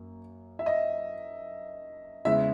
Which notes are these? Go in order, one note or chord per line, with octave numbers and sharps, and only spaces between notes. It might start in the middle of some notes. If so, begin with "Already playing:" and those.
Already playing: F#2 A#3
E5
D#5
E2 C#3 G#3 E5